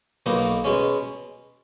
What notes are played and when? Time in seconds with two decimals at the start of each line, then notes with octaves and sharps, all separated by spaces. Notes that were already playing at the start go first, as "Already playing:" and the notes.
0.26 B1 B2 A#3 D#4 F#4
0.64 B2 G#3 C#4